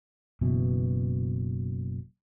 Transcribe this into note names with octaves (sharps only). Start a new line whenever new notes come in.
F#1 B2 E3